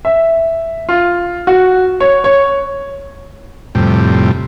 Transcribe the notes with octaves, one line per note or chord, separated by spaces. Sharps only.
E5
F4
F#4
C#5
C#5
F2 A2 C3 G3